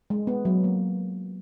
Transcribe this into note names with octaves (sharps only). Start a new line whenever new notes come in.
G#3
B3
F#3
A#3